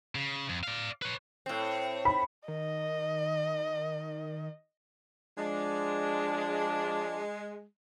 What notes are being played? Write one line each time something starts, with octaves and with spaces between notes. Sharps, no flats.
C#3
F2
D5 F5
B4 C#5
A2 C4
B5
D#3 D#5
F3 G#3 D4